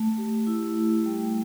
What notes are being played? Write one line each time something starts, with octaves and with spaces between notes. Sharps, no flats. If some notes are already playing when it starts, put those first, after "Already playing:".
Already playing: A3
G4
E4
A3
G3